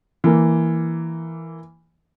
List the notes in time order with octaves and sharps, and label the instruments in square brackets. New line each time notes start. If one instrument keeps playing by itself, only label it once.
[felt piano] E3 A#3